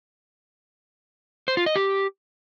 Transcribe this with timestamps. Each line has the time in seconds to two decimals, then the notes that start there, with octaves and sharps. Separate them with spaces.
1.48 C5
1.57 F4
1.66 D#5
1.76 G4